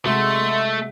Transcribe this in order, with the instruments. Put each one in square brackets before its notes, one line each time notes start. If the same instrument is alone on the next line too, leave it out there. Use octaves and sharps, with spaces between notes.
[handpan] C3 G#3 F#4 [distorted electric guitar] A3 [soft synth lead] E5 [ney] C6